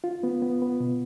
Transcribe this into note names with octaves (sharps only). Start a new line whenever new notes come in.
F4
B3
B3
B3
B2